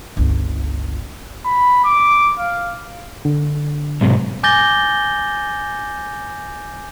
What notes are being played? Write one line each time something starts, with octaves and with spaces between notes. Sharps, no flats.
G1 C#2
B5
D6
F5
D3
B1 G#2 C3
G#5 D6 G6 A6 A#6 G7